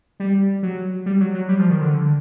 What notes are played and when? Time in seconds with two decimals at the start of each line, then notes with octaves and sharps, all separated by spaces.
0.20 G3
0.63 F#3
1.06 G3
1.20 F#3
1.34 F#3
1.49 G3
1.59 F3
1.70 D#3
1.81 D3